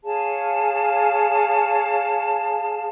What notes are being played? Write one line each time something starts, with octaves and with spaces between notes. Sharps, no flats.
G#4 C#5 F5 A5